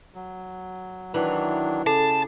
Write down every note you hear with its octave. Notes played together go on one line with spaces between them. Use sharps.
F#3
D#3 E3 F#3 D4
C#3 A4 A5